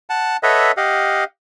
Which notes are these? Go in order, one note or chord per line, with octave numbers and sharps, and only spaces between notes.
F#5 A5
A4 B4 C#5 D#5 E5 F#5
G4 D#5 F5 F#5